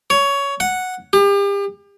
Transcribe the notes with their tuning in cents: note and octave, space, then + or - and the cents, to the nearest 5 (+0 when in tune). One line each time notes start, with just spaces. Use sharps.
C#5 +15
F#5 -5
G4 +35